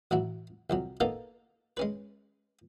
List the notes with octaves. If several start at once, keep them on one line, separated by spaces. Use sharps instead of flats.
A1 F#3 E4 F#4
C2 F2 F#3
A#3 B3 D#4 A4 A#4
G#3 C#4 B4